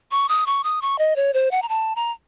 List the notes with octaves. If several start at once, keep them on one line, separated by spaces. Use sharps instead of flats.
C#6
D#6
C#6
D#6
C#6
D#5
C#5
C5
F#5
A#5
A5
A#5